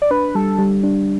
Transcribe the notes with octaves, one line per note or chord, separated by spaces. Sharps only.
D5
D4 B4
G3 A4
G3
D4